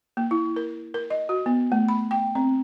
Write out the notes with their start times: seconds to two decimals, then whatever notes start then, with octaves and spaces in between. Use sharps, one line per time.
0.17 A#3
0.31 E4
0.56 A#4
0.94 A#4
1.10 D#5
1.29 F#4
1.46 B3
1.72 A3
1.88 B5
2.11 G5
2.35 C4